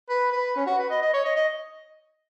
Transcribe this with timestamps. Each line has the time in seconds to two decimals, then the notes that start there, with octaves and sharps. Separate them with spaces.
0.10 B4
0.32 B4
0.56 C#4
0.67 F#4
0.79 B4
0.91 D#5
1.02 D#5
1.14 C#5
1.25 D#5
1.36 D#5